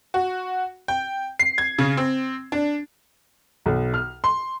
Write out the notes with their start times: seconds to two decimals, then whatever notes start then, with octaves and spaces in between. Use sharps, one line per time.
0.14 F#4
0.88 G5
1.39 C7
1.58 G#6
1.78 C#3
1.97 C4
2.52 D4
3.66 B1
3.94 F6
4.24 C6